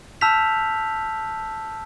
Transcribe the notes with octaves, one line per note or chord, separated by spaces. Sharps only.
A5 E6 F6 G6 B6 F7